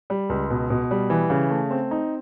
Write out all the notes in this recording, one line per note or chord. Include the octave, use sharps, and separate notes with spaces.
G3
C#2
B2
B2
G3
E3
C#3
A3
C4
D#4